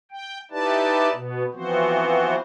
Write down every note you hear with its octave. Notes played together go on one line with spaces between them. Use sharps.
G5
D#4 E4 G4 B4 D5 A5
B2 B3
E3 F3 B3 C4 F#4 C5